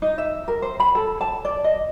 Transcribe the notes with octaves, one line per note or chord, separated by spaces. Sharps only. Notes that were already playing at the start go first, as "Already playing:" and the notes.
D#4
E5
A#4
C5
B5
A4
A5
D5
D#5